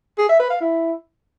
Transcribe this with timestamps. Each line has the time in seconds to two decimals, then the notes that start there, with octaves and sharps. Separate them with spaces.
0.18 G#4
0.29 E5
0.40 B4
0.50 F5
0.61 E4